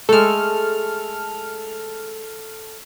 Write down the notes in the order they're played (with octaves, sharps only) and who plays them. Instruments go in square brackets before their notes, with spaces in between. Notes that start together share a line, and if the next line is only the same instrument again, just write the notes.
[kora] G#3 A3 [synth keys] A4 F6